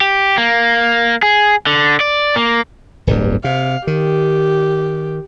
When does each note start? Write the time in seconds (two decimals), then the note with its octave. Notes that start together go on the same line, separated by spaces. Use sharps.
0.01 G4
0.37 A#3
1.23 G#4
1.67 D3
2.00 D5
2.36 A#3
3.07 D1 G1 G2
3.44 C3 F5
3.87 D#3 G4